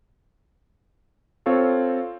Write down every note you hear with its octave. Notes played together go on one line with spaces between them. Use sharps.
C4 F4 A4 C#5 F5